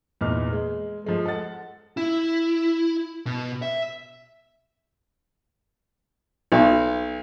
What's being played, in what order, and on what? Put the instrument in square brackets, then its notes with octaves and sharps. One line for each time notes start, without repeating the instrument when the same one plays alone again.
[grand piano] E2 A#2 D#4 B4 F6
G#3
F3 G#3 A3
A4 D#5 F#5 A6
[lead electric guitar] E4
B2
E5
[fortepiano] B1